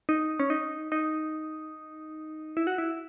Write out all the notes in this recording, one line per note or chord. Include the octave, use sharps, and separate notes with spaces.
D#4
C#4
D#4
D#4
E4
F#4
E4